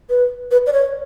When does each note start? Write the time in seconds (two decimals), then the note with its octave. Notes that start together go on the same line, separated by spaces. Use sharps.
0.10 B4
0.51 B4
0.67 D5
0.73 C#5